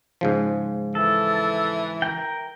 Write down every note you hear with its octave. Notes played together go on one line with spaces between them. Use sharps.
G#2 C#3 F3
E3 A4
A#4 G5